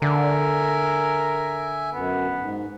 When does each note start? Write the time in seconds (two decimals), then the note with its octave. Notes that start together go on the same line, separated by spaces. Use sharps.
0.02 D3 A#4 E5 G#5
1.92 F#2 B3
2.39 G#2